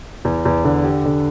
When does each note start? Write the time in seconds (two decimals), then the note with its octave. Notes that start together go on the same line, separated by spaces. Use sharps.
0.25 E2
0.45 E2
0.64 D3
0.84 G4
1.05 D3